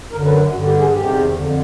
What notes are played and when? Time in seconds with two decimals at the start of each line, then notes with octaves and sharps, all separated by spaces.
0.11 F#2 A#4
0.15 D3
0.25 B4
0.52 G2 D3 F#4
0.65 G4
0.79 G#4
0.92 E2 C3 D#3 G4
1.33 F2 D3